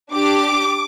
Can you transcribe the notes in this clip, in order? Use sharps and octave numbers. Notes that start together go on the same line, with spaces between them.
D4 G4 D6